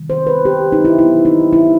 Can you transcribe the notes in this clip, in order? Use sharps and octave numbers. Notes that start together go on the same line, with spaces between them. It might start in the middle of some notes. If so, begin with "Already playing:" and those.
Already playing: C3 D#3 G3
C5
B4
G4
D#4
E4
B2 F#3 B3 E4
D#4
E4